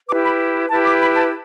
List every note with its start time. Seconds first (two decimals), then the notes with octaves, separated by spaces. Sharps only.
0.08 B4 D6
0.11 E4 G4
0.24 B5
0.69 E4 G4 B4 A5
0.86 D6
1.01 B5
1.16 A5